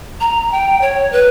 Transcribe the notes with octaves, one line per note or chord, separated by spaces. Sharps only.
A#5
G5
C#5
B4